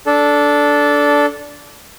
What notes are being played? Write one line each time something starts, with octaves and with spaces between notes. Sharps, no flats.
D4 A4